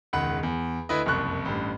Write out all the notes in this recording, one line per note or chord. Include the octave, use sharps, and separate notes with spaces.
E1 C#2 D#3 F#5 B5
E2
D2 E4 B4 D#5
F#1 C2 F2 C#6 F#6
A1 G2